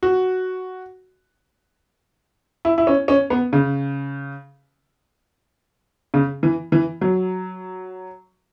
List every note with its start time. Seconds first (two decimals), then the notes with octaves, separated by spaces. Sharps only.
0.03 F#4
2.65 E4
2.78 E4
2.87 C#4
3.08 C#4
3.30 B3
3.53 C#3
6.14 C#3
6.43 E3
6.72 E3
7.01 F#3